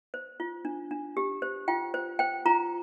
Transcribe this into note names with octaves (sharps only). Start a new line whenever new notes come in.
C5
F4
D4
D4
G4
C5
F4 G5
C5
C5 G5
F4 A#5